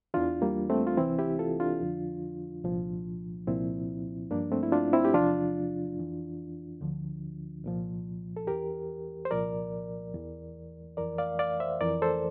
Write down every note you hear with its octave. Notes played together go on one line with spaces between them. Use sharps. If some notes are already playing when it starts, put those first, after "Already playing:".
E2 E3 D4 F4
G3 A#3
A3 C4
F4
C2 C3 E3 C4 E4
E4 G4
F4 A4
D4 F4
F2 D3 F3
C2 A#2 F3
C2 A#2 F3 C4 E4
G2 F3 A#3 D4
A3 C4
E4
D4 F4
C4 E4
G4
E2 C3 F3 D4 F4
F2 E3
D2 D3 F3
C2 A#2 F3
A4
E2 E3 G4 A#4
C5
C2 A#2 F3 A#4 D5
E2 E3
F2 E3 A#4 D5
D5 F5
D5 F5
C5 E5
F2 E3 A#4 D5
A4 C5